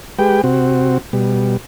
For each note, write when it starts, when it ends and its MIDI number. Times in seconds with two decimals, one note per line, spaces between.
0.19 0.42 56
0.19 0.42 67
0.19 0.42 71
0.19 0.42 79
0.44 0.98 48
0.44 0.98 60
0.44 0.98 66
1.13 1.57 47
1.13 1.57 55